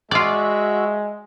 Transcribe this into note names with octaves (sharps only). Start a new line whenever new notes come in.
G#3 F4 F#4 D5 E5